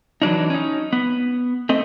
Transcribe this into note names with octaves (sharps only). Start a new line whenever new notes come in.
E3 F#3 D4 D#4
C#4 D#4
B3
A3 C4 D#5